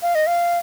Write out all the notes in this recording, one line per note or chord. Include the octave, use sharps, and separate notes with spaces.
F5
D#5
F5